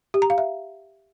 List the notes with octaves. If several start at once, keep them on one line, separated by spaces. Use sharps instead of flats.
G4
A#5
F5
E5